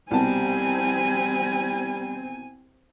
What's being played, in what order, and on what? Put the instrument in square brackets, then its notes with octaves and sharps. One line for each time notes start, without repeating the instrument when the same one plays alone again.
[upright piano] C2 B2 A5 [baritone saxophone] G3 [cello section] C4 [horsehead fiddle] G#5